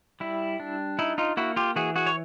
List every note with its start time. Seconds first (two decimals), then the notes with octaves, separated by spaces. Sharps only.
0.20 G3 E4
0.60 D4
0.99 D#4 E4
1.18 D#4 F4
1.37 A#3 E4 F#4
1.56 F4 G4
1.76 E3 F#4 G#4
1.96 F#4 G#4
2.06 C#5